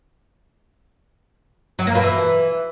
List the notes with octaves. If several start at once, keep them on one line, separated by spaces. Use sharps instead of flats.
F#3
A#3
B2
E3